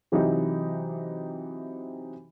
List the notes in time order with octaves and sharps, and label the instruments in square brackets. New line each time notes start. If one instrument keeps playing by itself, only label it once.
[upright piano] C3 E3 F#3 D#4 G4